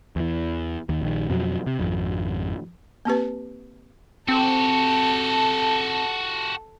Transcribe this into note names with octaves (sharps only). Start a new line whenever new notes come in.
E2 E3
D#2
A#1 D#3
F2 B2 F3 F#3
C3
G#1 F2
A#3 C4 G4 B4
C4 F#4 G4 A4 A5